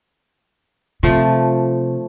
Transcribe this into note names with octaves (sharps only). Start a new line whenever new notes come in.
C3 F3 A3